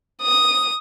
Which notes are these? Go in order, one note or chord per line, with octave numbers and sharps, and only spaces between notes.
D#6